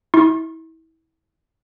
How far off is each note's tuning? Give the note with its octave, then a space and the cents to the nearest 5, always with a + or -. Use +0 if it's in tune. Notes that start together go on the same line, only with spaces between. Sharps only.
E4 -30 C#6 -45